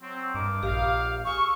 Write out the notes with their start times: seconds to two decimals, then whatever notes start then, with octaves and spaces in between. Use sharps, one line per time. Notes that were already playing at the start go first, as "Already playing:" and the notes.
0.01 F#3 C4
0.35 G2 A#4 D#5 D6
0.63 A#1 G4 F5
1.25 G#4 F5 C#6 E6